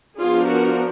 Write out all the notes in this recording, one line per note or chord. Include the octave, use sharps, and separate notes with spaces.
F3 B3 D4 F4 G#4
F#4 A#4